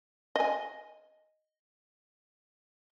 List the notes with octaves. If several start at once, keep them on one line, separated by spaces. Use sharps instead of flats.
D#5 G#5